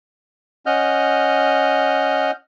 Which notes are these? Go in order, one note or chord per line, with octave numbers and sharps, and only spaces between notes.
C#4 D#5 F#5 F6 G6